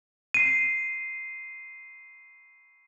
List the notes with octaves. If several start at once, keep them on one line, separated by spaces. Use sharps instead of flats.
C7 D#7